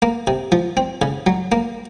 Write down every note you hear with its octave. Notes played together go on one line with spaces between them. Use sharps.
A#3
C3
F3
C4
C#3
F#3
A#3